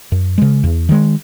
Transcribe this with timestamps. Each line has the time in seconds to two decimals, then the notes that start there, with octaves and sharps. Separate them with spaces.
0.12 F#2
0.38 C#3 G#3
0.63 E2
0.89 D#3 G#3